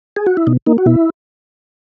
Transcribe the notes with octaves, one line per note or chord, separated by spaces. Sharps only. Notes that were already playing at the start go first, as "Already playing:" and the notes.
G#4
F#4
E4
B2 D#4
A#3 D#4
F#4
B2 E4